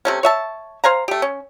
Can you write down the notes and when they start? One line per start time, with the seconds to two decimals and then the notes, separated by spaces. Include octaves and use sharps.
0.05 C3 A3 C#4
0.23 C#5 E5 A5
0.84 C5 F5 G#5 A#5
1.08 A3 G4
1.22 C#4